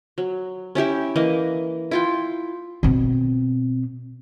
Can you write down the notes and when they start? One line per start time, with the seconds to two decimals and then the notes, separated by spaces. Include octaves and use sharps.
0.18 F#3
0.75 C#4 E4 G4 E5
1.16 E3 A#3 D#5
1.91 E4 F4 G5
2.83 B2 C4